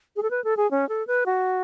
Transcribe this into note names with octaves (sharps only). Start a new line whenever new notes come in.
G#4
A4
B4
A4
G#4
C#4
A4
B4
F#4